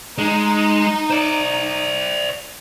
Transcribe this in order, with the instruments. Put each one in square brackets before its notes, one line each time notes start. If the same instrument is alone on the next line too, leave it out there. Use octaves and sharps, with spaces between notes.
[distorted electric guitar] G#3 [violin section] D#4
[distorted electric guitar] C5 D5